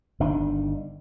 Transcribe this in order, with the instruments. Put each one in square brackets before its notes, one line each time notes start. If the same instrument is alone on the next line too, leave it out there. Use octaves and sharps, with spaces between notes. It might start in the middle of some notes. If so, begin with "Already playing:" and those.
[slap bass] G1 D#3 D4